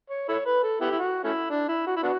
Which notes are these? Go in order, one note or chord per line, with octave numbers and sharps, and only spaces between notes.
C#5
E4 A4 C#5
B4
A4
B3 E4 G4
E4
F#4
A3 C#4 E4
D4
E4
F#4
E4
B3 D4 F#4